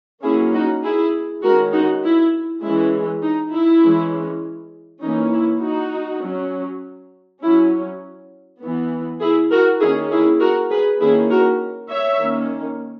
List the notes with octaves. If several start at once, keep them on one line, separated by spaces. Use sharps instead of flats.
F#3 A#3 C#4 E4 G#4
D#4 F#4
E4 G#4
D#3 G#3 C#4 F#4 A#4
D#4 F#4
E4
E3 G#3 C#4 E4
D#4
E4
E3 G#3 C#4
E3 A#3 C#4 D#4
E4
D#4 F#4
F#3 C#4
F#3 C#4 E4
E3 B3
E4 G#4
F#4 A#4
D#3 A#3 C#4 E4 G#4
E4 G#4
F#4 A#4
G#4 B4
D#3 A#3 C#4 E4 G#4
F#4 A#4
C#5 E5
D#3 A#3 C#4